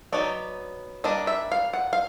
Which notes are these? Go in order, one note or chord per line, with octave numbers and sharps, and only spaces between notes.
F#3 B3 D#4 D5
G3 A#3 D4 D#5
E5
F5
F#5
F5